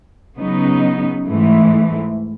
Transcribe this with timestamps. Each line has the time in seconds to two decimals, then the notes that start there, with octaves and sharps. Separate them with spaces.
0.36 C#3 F#3 B3 D#4
1.24 G#2 E3 A3